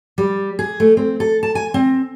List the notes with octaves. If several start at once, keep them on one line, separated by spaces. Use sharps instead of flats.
G3
G#4
A3
C4
A4
A5
G#5
C4